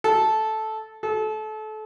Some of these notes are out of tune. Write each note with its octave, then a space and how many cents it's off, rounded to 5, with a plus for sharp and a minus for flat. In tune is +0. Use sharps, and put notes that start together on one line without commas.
A4 -10
A4 -30